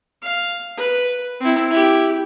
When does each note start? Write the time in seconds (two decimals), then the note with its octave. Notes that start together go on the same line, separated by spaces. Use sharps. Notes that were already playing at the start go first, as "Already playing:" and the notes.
0.22 F5
0.77 B4
1.40 C4 E4
1.70 E4 G4